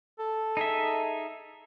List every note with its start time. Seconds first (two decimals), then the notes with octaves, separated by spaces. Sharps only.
0.19 A4
0.57 D#4 G#4 E5